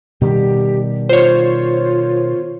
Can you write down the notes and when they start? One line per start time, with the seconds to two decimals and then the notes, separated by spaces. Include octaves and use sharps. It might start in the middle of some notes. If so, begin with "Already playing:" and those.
0.21 B2 D#3 G3 G4
1.09 F4 C5 C#5